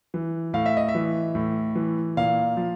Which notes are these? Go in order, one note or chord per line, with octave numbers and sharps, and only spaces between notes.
E3
A2 F5
E5
D#5
E5
E3
A2
E3
A#2 F5
F3